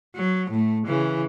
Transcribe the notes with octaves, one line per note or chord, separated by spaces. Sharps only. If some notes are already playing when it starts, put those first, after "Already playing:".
F#3
A2 A3
C#3 E3